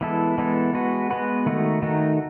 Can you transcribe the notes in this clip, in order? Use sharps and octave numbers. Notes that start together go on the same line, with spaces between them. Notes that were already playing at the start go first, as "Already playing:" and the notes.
E3 G#3 B3 E4 A4
E3 G#3 B3 E4 A4
G#3 B3 F#4 B4
G#3 B3 F#4 B4
D#3 A3 D#4 F#4
D#3 A3 D#4 F#4